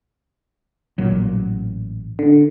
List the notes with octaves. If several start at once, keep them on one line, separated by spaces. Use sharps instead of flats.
A1 A#2 F#3
D3